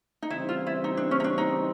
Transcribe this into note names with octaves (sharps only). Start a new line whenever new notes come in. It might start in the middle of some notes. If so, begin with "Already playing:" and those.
D#4
C#3 E3 G3 C4 E4
F4
E4
D#4
D4
C#4
D#4
D4
D#4